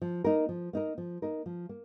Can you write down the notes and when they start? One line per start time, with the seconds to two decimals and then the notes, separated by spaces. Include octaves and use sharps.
0.02 F3
0.24 A#3 D#4 A#4
0.49 F3
0.73 A#3 D#4 A#4
0.98 F3
1.22 A#3 D#4 A#4
1.46 F3
1.69 A#3